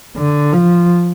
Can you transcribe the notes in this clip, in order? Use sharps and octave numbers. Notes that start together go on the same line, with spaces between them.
D3
F3